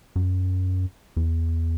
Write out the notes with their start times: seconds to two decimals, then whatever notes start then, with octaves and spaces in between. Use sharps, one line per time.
0.16 F#2
1.17 E2